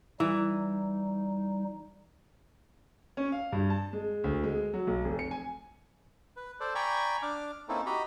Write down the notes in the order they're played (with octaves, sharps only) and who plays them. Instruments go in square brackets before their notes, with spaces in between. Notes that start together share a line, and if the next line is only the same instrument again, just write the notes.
[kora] E3 [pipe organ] G3 D#4
[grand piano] C#4
F5
G2
A5
G#3
D2
G#3
F#3
B1
F1
C#7
G#5
[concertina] B4
A4 C5 D5
D5 G5 G#5 A#5 B5 C#6
D4 D6 F6
A#3 C4 C#4 D#4 E4 A4
F#4 G4 D#5 A#5 B5